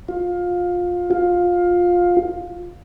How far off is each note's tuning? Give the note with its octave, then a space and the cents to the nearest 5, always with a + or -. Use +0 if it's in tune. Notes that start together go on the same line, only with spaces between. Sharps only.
F4 +20
F4 +15